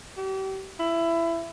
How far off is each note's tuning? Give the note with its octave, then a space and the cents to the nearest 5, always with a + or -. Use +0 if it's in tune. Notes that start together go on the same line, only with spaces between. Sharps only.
G4 -35
E4 +20